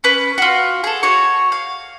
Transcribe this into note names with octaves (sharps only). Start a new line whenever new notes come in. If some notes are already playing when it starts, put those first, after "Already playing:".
C#4 B4
F4 F#4
G#4 A4
F#4 C#5 C#6
F5